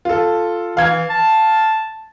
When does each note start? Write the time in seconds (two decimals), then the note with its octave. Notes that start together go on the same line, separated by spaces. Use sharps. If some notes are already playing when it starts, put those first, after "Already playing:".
0.05 F4 A4
0.77 E3 F5 G#6
1.10 A5